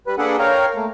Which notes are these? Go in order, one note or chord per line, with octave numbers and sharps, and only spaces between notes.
G3 B4
A#3 D4 G#4 A4 B4 F#5
A#4 C#5 F5 G5 A#5
A3 A#3